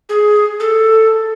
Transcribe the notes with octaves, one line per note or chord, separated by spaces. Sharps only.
G#4
A4